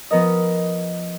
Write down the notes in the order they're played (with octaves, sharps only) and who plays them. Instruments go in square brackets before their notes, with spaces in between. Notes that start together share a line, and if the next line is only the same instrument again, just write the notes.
[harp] F3 B3 A#4 D#5